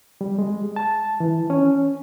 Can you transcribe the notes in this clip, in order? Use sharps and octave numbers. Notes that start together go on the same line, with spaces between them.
G3
G#3
A5
E3
C#4